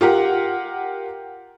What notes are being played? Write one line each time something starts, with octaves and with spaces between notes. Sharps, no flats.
F4 G4 A#4 F#5